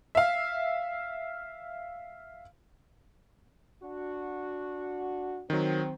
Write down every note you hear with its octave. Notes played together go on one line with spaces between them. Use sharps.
E5 F5
D4 F#4
D#3 F#3 C4